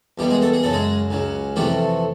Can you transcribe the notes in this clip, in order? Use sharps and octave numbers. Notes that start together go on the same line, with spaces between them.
E2 B2 G3 A#3 G4
G#3 G#4
A3 A4
G#4
F#2 C#3 F#3 A4
G#3 G#4
C#2 C#3 F#3
F2 C3 E3 G3 A3 G4